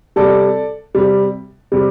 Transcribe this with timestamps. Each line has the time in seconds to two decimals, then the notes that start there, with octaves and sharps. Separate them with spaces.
0.16 C3 G3 A4 D5
0.95 C3 G3
1.72 C3 G3